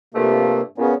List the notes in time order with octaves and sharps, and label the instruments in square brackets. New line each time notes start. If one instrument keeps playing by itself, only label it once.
[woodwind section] G2 F3 A3 [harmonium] C3 A#3
[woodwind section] A#2 C#3 [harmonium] B3 C#4